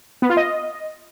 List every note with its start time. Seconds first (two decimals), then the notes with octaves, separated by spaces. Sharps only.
0.22 B3
0.30 F4
0.37 D#5